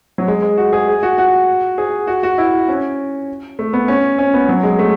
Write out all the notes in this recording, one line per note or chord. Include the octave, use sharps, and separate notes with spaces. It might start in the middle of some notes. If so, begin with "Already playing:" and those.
F#3
G#3
G#3
F#4
G#4
G#4
F#4
F#4
G#4
F#4
F#4
E4
C#4
A3
B3
C#4
C#4
B3
F#3
G#3
A3